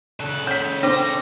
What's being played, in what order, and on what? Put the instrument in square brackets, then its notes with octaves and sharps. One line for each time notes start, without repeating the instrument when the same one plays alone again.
[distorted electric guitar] C#3 A4 [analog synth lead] F#6
[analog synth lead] C#4 [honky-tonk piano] G6 B6
[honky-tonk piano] C4 [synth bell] D4 D6 [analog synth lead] A#6